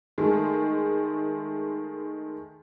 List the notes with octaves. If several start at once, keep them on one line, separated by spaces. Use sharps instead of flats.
D#3 G#3 A3